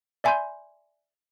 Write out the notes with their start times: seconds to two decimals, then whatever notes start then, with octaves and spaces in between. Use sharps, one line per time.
0.24 D5 E5 G#5 B5 C6 G6